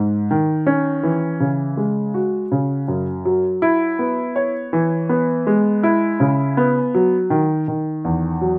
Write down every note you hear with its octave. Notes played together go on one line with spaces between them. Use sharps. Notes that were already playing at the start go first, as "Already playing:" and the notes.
Already playing: G#2
D#3
C#4
E3
C#3
G#3
F#4
C#3
F#2
F#3
E4
B3
C#5
E3
B3
G#3
E4
C#3
B3
F#3
D#3
D#3
E2
F#3